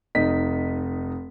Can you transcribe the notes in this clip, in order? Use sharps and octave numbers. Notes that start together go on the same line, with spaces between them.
F1 D#4 B6